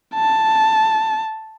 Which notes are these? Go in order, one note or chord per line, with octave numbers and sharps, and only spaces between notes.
A5